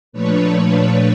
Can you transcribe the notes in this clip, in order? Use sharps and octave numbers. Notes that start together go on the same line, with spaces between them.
A#2 F3 A3 D4 B4 C#5